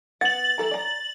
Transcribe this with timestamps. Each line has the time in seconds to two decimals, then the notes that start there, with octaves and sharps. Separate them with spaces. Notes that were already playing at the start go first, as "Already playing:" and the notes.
0.21 B3 F#5 A6 F#7
0.58 E3 A4 A#5
0.71 D5 A#5